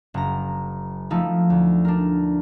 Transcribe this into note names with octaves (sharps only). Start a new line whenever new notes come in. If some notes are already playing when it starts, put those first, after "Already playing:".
F#1 A#5
F3 A3 D#4 E4
D2
D4 A#4